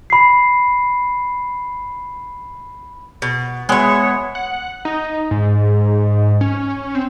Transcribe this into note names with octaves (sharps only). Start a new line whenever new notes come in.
B5 C7
B2
G#3 B3 C#5 E5
F#5
D#4
G#2
C#4
C4